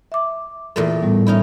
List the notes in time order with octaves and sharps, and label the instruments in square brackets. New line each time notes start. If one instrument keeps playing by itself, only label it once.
[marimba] E5 D6
[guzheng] E2 A#2 A3
[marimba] A2 G3 B3
[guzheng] C#4 D#4 E4